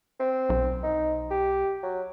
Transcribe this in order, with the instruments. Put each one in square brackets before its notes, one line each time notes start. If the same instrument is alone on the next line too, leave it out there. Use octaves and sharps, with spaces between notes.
[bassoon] C4
[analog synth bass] B1
[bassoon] D#4
G4
F#3